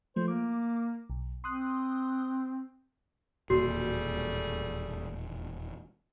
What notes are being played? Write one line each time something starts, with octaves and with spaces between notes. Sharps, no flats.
F3 A3 C5
A#3 D6
B1
C4 C6 D#6 F#6
E1 D#2 A#2 G3 A3 F#4 G#4